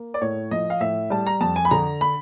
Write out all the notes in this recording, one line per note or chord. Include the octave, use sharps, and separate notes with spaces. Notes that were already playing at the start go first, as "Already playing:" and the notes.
Already playing: A#3
D5
A2 C#5
F3 D#5
F5
A2 E5
G3 A5
A#5
F2 A5
G#5
B5
D3 A#5
B5